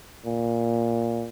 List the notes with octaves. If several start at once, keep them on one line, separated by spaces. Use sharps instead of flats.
A#2